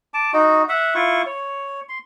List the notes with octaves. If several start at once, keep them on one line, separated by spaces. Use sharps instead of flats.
A5 D6
D#4 F#4
E5 F#5
E4 F4 C#6
C#5
C6